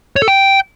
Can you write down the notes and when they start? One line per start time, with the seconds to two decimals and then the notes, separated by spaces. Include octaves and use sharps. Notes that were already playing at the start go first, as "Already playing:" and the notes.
0.16 C#5
0.22 A4
0.28 G5